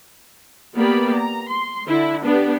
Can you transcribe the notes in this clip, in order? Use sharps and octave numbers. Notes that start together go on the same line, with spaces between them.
A#3 B3 G4 D5 B5
A#5
C6
D3 E4
B3 D4 G4